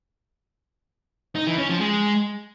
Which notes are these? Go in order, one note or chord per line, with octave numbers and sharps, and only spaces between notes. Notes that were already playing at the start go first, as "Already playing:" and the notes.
D#4
E3
C#4
F3
G#3